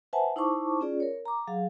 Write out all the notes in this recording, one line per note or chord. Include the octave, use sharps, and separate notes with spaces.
B4 C5 E5 F#5 G#5 A5
D#4 E4 C5 A5 C#6 D6
C#4 F4 G#4 D5
A#4 C#5
A#5 D6
F#3 G#4 F5